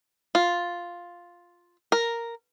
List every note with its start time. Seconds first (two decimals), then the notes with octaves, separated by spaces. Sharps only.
0.35 F4
1.92 A#4